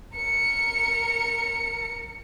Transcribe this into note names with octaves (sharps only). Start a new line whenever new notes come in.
A#4 C#7